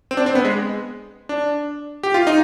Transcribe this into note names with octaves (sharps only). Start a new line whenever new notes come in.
C4
D4
C4
B3
G#3
D4
G4
F4
D#4